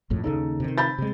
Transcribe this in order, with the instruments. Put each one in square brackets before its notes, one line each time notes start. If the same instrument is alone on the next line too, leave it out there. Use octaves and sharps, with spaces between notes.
[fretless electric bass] G#1 F2 A2
[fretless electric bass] D#2 C#3 [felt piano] D#4 A4
[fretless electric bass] C3 D#3
[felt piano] B5 G6 A6
[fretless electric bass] C3 G#3